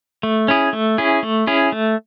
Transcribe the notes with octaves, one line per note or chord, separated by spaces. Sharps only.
A3
C#4 E4 G#4
A3
C#4 E4 G#4
A3
C#4 E4 G#4
A3